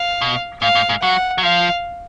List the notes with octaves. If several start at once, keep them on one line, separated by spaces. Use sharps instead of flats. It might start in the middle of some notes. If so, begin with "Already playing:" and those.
Already playing: F5
B2
G#2 F5
G#2
G#2
F#3 F#5
F#3
F3 F5